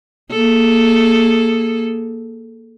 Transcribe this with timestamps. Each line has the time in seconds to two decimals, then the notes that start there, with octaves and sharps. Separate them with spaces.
0.32 A#3 G#4 A4